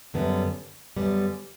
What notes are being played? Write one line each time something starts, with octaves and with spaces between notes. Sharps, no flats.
F#2 D3 G3 B3
F#2 D3 G3 B3